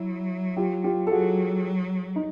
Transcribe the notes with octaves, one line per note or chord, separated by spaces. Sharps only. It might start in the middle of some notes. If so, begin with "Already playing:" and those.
Already playing: F#3 E4
F4 G4
F4 G4
A4
F#3 F#4 G#4
D#4